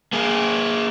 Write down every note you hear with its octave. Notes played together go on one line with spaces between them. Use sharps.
A#3 G#4